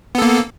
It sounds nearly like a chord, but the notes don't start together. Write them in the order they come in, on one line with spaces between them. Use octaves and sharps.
B3 A4 A#3